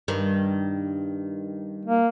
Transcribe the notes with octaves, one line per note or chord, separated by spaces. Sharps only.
G2 D#3
A#3